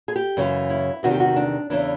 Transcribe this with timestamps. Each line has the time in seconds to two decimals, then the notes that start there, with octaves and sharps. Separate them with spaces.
0.08 G#4
0.16 G4
0.37 F#2 C#3 E3
0.70 E4
1.03 E2 C3 D#3 F#4
1.11 G4
1.20 F#4
1.36 D4
1.70 E2 C#3 E3 D4